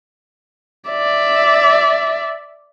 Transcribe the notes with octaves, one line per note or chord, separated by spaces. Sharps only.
D5 E5